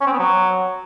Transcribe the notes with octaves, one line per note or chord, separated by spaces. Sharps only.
C#4
C4
B3
F#3